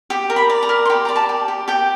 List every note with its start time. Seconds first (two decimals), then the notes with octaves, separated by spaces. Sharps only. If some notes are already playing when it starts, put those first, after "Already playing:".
0.10 G4
0.30 A#4
0.36 B5
0.50 D5
0.63 A#5
0.69 A#4
0.85 C6
0.90 G4 B5
1.05 D5 A#5
1.16 A5
1.29 G4
1.48 G4
1.68 G4 G5